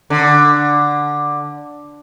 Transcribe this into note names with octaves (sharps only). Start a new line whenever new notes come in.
D3